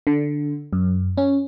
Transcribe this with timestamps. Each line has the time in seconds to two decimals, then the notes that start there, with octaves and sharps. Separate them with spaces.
0.07 D3
0.73 F#2
1.17 C#4